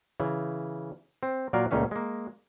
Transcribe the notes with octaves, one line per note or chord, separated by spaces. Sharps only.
C#3 E3
C4
A#2 F#3 A#4 D5 F5
C#2 A#2 A3 C#4 F5
G#3 A#3